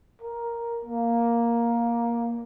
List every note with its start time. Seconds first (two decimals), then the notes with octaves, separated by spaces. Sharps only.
0.22 A#4
0.85 A#3